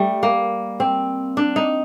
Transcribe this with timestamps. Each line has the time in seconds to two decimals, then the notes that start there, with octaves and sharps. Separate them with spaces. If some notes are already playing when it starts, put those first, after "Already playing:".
Already playing: G3 A3
0.23 A#3
0.80 C4
1.37 D4
1.56 D#4